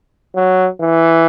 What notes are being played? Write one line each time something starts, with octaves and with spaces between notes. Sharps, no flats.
F#3
E3